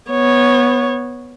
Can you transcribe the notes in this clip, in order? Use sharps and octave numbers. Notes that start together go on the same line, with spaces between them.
B3 C#5